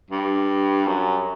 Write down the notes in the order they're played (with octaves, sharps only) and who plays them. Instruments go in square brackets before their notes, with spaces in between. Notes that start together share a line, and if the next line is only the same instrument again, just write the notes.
[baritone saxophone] G2
F#2